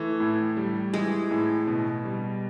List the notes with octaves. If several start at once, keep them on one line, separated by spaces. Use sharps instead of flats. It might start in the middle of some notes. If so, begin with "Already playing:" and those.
Already playing: E3 A3
A2
G3
E3 G#3
A2
B2
G3